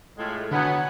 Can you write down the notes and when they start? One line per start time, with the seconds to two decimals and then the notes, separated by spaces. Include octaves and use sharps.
0.17 A2 G#3 F4
0.51 D3 F#3 B3 F#5 G#5